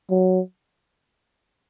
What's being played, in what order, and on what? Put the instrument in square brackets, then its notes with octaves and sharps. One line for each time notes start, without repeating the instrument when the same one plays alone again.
[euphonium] F#3